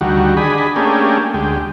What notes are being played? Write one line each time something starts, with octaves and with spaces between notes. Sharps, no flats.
D2 D#3 G3 F#4
D4 G#4 D#5 B5
A3 A#3 C#4 D4 G4 G#4
D2 G#3 G4